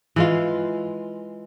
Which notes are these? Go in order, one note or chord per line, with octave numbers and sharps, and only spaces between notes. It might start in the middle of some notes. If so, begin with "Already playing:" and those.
E3 G#3 F4